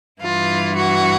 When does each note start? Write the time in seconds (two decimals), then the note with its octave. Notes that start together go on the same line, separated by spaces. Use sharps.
0.21 G2 E3 F4
0.75 F#4